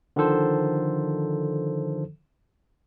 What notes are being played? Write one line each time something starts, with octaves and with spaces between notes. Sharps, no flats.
D3 D#3 F3 A4 C5